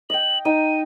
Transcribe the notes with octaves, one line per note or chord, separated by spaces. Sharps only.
D#5 G5 F#7
D#4 G5 D#7